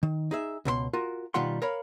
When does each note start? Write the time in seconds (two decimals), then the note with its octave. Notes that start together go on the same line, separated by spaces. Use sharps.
0.03 D#3
0.31 D#4 G#4 E5
0.65 C#2 B2 A#4 C6
0.93 F4 F#4 A#4
1.34 B2 D#3 G3 F4 F#5 C6
1.62 A#4 C#5 F5 B5